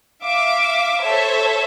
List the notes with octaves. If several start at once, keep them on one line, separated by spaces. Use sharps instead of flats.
E5 F5 D6
A4 C5 C#5 E5